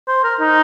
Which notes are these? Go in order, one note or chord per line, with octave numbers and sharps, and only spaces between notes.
C5
A#4
D#4